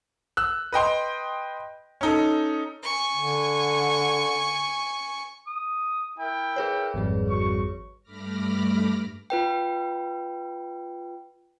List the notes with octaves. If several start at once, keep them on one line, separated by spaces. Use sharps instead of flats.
E6 F#6
B4 D#5 G5 C6
C#4 D#4 A4
G#5 C#6
D3
D#6
E4 A#4 G5
G#4 B4 C#5
G#1 F2 G3
F#4 C#6
G2 A3 B5 D6 F6 A#6
F4 B4 G5